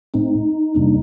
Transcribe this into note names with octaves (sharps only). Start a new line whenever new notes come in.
A2 A3 C4 D#4
F2 C3 G3 A#3 D4